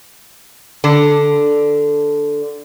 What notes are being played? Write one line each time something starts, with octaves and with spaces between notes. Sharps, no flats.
D3 D4